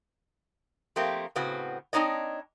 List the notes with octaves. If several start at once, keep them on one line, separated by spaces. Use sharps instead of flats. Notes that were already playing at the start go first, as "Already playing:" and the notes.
F3 A3 A#3 C4 G4
A2 C#3 B3 C4 F#4
C4 D4 D#4 C#5 D#5